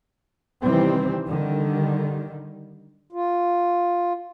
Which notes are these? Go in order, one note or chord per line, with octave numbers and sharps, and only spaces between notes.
C3 D#3 E3 G3 C4
D3 D#3 G3
F4